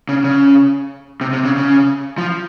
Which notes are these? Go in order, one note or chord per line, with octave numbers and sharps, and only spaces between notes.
C#3
C#3
C3
C3
C#3
C#3
F3